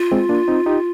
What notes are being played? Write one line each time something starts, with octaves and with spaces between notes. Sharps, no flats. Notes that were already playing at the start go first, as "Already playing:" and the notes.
Already playing: F4
G#3 C4
A#3 D4
C4 D#4
D#4 G4